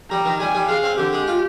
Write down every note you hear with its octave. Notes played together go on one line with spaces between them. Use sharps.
G3 A#5
D#3
G3 G#5
G3
G#3 F5
C4
D3 G4
G#3
F4